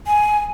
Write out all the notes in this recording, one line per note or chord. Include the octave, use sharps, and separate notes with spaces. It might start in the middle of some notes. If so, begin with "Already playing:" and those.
G#5